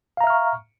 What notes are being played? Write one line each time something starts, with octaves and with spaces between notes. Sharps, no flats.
E5 F5 A#5 C#6 F6